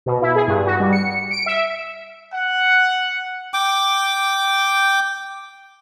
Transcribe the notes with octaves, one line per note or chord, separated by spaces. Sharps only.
B2
E4
G#4
G2
F#4
G3
C#7
D7
E5
F#5
G5 D6